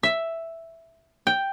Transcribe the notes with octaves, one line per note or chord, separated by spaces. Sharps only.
E5
G5